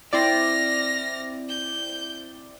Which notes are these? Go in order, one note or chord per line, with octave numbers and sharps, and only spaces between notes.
C4 E4 D5 F6 A#6
G6